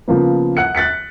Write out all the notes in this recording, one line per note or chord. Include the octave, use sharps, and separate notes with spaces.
C#3 F3 A#3 B3
F#5 F#6 C#7
F#6 A6 B6 C#7